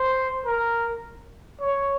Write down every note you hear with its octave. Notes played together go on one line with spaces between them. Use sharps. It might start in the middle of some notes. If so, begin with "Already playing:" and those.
Already playing: C5
A#4
C#5